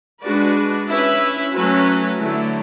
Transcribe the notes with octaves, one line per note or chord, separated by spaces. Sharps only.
G#3 D4 F#4 B4 D5
C#4 E4 B4 E5
F#3 A3 C#4 F#4 B4
D3 F#3 A3 E4